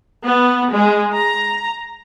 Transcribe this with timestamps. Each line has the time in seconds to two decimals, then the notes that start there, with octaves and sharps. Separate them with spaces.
0.24 B3
0.72 G#3
1.14 A#5